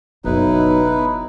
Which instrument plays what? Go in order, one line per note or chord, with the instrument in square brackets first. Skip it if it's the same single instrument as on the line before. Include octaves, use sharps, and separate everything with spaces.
[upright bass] F#1 [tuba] B1 [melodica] D#4 E4 B4